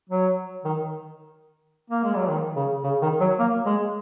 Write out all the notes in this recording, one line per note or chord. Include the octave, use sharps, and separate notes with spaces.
F#3
D#3
A#3
G#3
F#3
D#3
C#3
C#3
D#3
F#3
A#3
G#3